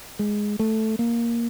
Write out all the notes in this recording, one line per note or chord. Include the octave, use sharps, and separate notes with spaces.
G#3
A3
A#3